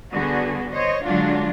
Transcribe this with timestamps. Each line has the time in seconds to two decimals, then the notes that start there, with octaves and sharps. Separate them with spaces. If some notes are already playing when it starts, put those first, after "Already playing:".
0.12 D3 G3 B3 F#4 G#4
0.71 C5 C#5 D#5
1.05 D3 F#3 G#3 D4 F4 F#4